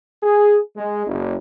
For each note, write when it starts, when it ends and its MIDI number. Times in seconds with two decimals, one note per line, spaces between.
0.23 0.58 68
0.77 1.04 56
1.07 1.36 30